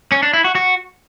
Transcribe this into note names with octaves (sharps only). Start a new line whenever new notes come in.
C#4
D4
E4
F#4
F#4